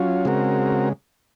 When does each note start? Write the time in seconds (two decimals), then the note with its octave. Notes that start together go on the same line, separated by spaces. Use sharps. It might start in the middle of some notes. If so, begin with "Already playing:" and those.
Already playing: F#3 C#4 F4
0.25 C#3 G#3 C4 F#4 A#4